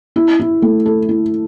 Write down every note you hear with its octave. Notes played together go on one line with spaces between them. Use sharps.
E4
E4
A3
A4
E4